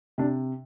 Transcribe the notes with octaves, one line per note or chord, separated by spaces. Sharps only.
C3 D4